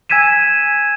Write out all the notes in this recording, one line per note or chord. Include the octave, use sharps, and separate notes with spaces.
G#5 E6 G#6 B6 D#7 E7